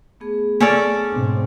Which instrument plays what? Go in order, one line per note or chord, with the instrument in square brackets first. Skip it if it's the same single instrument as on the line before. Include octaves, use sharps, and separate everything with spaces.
[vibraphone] A3 B3 G#4
[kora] C#4 A4 D5
[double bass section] G#2 B2 C4 [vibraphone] D4